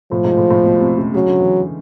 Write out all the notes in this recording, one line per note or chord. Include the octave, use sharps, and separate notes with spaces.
A2 F3
G#2
A2
A2
B2
C3
C#3
C#3 F#3
D3
E3